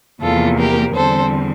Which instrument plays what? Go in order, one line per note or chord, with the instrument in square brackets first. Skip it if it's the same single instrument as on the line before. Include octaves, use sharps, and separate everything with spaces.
[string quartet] E2 C3 F3 A#3 F4 A4
G4 A#4
E2 D3 G3 C4 A4 C5